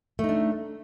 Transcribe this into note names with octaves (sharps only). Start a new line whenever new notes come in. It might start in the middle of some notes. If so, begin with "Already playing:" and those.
A3 D4 D#4